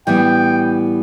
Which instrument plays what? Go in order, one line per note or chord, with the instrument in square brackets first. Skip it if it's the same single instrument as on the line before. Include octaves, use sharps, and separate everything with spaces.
[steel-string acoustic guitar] A2 E3 G3 B3 [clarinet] G5